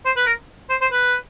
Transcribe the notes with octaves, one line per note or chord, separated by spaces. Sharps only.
C5
B4
A#4
C5
C5
B4